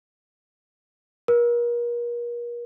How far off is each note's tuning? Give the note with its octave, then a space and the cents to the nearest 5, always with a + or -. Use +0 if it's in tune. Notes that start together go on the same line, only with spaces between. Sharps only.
A#4 +40